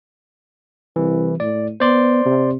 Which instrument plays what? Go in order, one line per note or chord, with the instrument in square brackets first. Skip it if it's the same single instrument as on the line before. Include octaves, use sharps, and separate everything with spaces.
[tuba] C2 [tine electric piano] E3
[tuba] A2 [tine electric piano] D5
[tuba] B3 [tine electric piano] C5 D5 C6
[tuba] C3